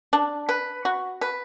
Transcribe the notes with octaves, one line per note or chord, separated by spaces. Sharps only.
D4
B4
F#4
B4